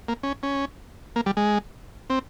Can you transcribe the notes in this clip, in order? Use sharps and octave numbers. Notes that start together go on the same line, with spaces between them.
A#3
C#4
C#4
A#3
G3
G#3
C4